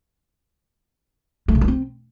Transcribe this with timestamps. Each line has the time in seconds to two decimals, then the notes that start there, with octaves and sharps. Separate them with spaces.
1.48 A3
1.55 C#3
1.61 A3
1.68 C4